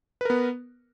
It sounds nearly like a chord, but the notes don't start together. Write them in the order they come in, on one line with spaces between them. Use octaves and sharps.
B4 A#4 B3